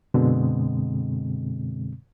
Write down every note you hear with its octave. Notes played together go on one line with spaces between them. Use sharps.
F#2 B2 D3 G#3 C4